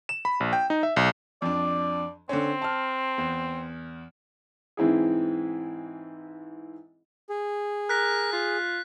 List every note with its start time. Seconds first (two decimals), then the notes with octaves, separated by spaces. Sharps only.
0.09 E7
0.25 B5
0.40 A#1
0.53 G5
0.70 D#4
0.83 E5
0.96 B1
1.42 F2 D4 D5
2.29 D3 C4 C#4
2.62 A5 F6
3.18 E2
4.77 G#2 E3 C4 E4 G#4
7.29 G#4
7.89 A#4 F#6 B6
8.33 F4